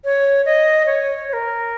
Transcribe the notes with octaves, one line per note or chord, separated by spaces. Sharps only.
C#5
D#5
C#5
C#5
A#4